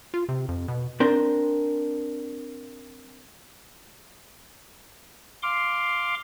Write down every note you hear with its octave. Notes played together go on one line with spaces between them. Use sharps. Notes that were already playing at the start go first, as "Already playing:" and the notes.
F4
C3
F2
B2
C4 D4 A#4 C5
F5 C6 D6